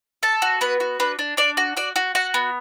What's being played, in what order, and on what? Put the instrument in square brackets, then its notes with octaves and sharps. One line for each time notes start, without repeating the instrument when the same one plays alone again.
[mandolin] A4 A5
F#4
B3 B4
F#4
D4 B4
D4
D4 D5
F#4
F#4 D5
F#4
F#4 F#5
B3